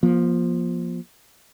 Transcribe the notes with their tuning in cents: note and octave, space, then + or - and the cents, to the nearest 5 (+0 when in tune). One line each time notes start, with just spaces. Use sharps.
F3 +5 A#3 +40